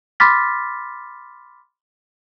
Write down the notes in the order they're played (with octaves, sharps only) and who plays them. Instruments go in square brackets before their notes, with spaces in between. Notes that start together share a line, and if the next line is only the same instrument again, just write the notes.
[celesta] B5 C6 D6 F6 A6 B6